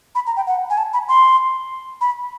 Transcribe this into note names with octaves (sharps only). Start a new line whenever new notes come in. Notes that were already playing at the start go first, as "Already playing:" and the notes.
B5
A#5
G5
F#5
G#5
A5
B5
C6
B5